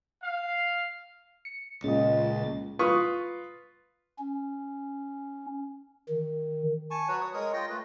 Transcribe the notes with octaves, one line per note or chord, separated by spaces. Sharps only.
F5
C#7
C#2 A#2 G#3 C#4 D#5 A6
F4 B4 C#6 D#6
C#4
D#3
G#5 A5 C#6
F#3 F#4 B4 C#5
C#5 D#6
G#3 A#4 C#5 D#6
F4 D#5 G5
A3 F4 B4